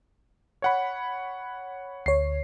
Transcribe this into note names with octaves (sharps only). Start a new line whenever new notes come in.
C#5 F#5 B5
D2 C#5 C7